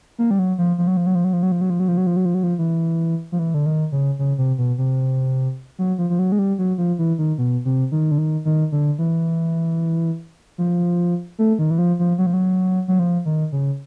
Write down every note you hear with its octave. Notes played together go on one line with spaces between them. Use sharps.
A#3
G3
F#3
F3
F3
F#3
F3
F#3
F3
F#3
F3
F#3
F3
F#3
F3
F#3
F3
F#3
F3
F#3
F3
F#3
F3
E3
F3
E3
D3
D#3
C#3
C#3
C3
B2
C3
F#3
F3
F3
F#3
G#3
G3
F#3
F3
E3
D#3
B2
C3
D#3
D3
D#3
D#3
D3
E3
F3
A3
D#3
E3
F3
F3
F#3
F3
F#3
F#3
F3
D#3
C#3